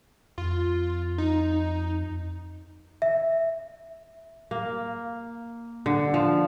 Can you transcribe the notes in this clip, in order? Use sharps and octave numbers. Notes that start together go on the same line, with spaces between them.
F2 F4
D#4
E5
A#3
D3
F3